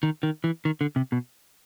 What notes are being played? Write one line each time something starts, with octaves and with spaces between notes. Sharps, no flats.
D#3
D#3
E3
D#3
D3
C3
B2